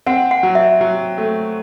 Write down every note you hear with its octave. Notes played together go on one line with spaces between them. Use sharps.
C4 F#5
F#5
F#3
E5
F#3
A3